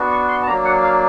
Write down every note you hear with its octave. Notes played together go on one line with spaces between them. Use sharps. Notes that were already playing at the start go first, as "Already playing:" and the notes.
Already playing: B3 D4 F#4
C#6
C6
A5
F#3 A#3 D4 A#5
F#5
F5